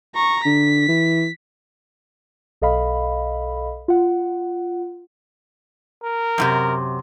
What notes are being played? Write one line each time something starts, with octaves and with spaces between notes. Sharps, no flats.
A#5 C#6
D3 B6
E3
B1 A4 D#5 F5 B5
F4 F#5
A#4
F#2 A2 C3